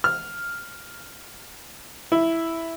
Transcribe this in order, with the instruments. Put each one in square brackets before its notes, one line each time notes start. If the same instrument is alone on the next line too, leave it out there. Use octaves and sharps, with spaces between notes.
[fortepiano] F6
E4